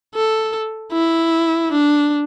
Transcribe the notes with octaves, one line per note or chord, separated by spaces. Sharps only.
A4
E4
D4